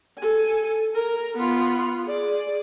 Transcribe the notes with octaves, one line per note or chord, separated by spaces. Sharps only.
A4 G#5
A#4
B3 F4
G#4 D5